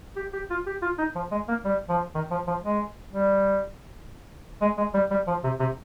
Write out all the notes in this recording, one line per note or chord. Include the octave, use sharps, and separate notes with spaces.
G4
G4
F4
G4
F4
D#4
F3
G#3
A#3
G3
F3
D#3
F3
F3
G#3
G3
G#3
G#3
G3
G3
F3
C3
C3